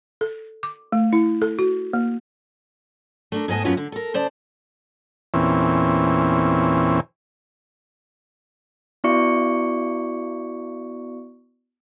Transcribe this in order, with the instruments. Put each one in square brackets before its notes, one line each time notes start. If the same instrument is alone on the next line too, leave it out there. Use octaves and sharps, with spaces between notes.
[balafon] A4
D6
A3
E4
A4
F#4
A#3
[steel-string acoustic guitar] A3 D4 A#4
G#2 B3 D#5 G#5 A5
F#2 B3 C#4 F4 F#4
D3
A4 A#4
C#3 C5 D5 A5
[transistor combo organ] E2 A#2 E3 C4 C#4
[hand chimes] B3 E4 F#4 D5 C#6 C#7